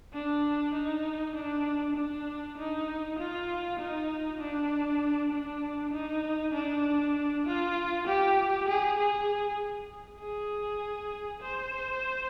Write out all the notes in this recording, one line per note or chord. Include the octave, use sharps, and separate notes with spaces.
D4
D#4
D4
D4
D#4
F4
D#4
D4
D4
D#4
D4
F4
G4
G#4
G#4
G#4
C5